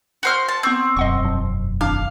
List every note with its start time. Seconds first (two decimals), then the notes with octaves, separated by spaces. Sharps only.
0.23 F#4 C5 F6
0.48 A5
0.63 B3 C4 C#6 G6
0.97 E1 F#2 D#5 F#5 C#6
1.25 F3
1.81 G#1 D4 F5 D6